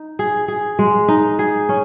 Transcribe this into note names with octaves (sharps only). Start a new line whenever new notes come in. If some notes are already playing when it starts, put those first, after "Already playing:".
Already playing: D#4
G#4
G#4
G#3
D#4
G#4
C#4